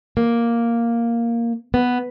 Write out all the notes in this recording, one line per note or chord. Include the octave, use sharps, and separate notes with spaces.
A#3
B3